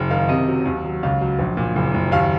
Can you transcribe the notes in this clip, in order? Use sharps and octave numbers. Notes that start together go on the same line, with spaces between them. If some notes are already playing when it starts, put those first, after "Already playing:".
Already playing: F#1
D#3 F5
C3 D#5
F#3
D#2
F#3
C#2 F5
F#3
A#1
A#2
F#1
F#1
D#2 F5